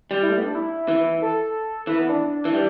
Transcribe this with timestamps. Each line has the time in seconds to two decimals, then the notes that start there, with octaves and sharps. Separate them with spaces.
0.11 G3
0.22 E4
0.29 A3
0.37 B3
0.44 D4
0.55 E4
0.88 E3
1.22 A4
1.87 E3 B4
1.99 B3
2.09 D4
2.45 E3
2.53 G3